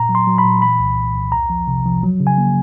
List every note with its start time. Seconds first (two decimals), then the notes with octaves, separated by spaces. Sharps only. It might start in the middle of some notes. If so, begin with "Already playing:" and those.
Already playing: A#2 A#5
0.09 F#3
0.15 C6
0.27 F#3
0.38 B5
0.45 A#2
0.62 E3 B5
0.79 C2
0.97 C2
1.15 C2
1.32 E2 A#5
1.50 F3
1.68 C3
1.86 F3
2.03 F#3
2.20 C#3
2.27 G#5
2.38 A#3